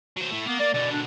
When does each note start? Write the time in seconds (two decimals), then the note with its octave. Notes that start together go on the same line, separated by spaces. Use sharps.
0.17 F#3 C5
0.31 A2 A3
0.47 A#3 B3
0.60 A#3 D5
0.74 B2 D3 D5
0.92 D4